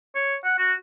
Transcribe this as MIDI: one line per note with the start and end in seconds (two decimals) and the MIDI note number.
0.15 0.35 73
0.44 0.55 78
0.58 0.73 66